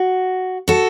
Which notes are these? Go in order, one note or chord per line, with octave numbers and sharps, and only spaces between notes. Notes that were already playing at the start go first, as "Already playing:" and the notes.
Already playing: F#4
F#4 A4